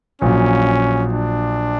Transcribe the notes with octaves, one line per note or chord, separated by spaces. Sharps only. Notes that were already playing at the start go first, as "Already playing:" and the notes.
A#1 A#2 F#3 C#4
D4